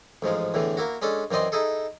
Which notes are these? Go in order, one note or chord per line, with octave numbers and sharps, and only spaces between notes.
A1 G#2 F3 G#3
E2 A2 D3 E3
A#3 E4 F#4
G#3 C#4 D4 A4
F#2 E3 C4 D5 D#5 C6
D#4 E4 G#4 A4